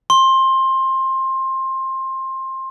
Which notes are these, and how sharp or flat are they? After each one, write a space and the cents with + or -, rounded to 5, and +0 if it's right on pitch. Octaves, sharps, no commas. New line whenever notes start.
C6 +20